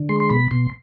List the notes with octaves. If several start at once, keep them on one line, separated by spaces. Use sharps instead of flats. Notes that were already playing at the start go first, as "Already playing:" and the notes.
Already playing: D3
G#3 C6
C6
B2 B5
B2 C6